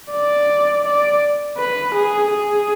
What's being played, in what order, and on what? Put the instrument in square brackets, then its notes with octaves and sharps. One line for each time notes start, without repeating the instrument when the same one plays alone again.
[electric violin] D5
D5
B4
G#4
G#4